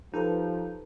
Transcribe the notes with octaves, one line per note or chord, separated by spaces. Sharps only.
F3 D#4 G4 A4 B4